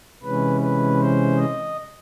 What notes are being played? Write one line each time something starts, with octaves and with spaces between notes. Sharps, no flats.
C3 E3 G#3 C#4 B4
B4
C5
D#5